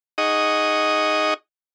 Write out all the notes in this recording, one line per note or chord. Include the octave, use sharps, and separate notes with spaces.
D#4 G#4 D#5 F#5 C#6 D#6